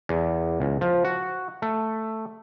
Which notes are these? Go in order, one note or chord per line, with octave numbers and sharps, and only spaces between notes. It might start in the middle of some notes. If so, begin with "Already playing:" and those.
E2
C#2
F3
F#4
A3